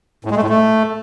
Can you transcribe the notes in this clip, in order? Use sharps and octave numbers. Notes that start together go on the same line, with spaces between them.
A2
G#3
A3
A2
A3